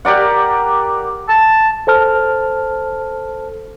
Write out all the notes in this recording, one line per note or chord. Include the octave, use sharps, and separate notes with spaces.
G4 A#4 D5 F#5
A5
A4 C5 A5 F6